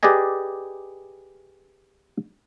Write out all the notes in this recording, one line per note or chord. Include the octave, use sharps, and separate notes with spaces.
G4 G#4 B4 D5 D#5 G#5